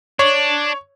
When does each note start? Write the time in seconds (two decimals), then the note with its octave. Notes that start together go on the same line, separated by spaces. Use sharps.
0.19 D4 C#5